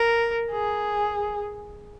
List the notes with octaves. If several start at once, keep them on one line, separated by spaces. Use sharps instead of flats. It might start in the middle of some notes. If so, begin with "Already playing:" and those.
Already playing: A#4
G#4